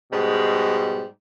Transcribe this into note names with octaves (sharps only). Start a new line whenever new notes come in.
G#2 B2 G3 G#3